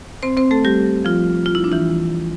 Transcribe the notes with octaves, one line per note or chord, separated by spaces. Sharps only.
C4 C5
C4 C5
A3 A4
G3 G4
F3 F4
F4
E4
D4
E3 E4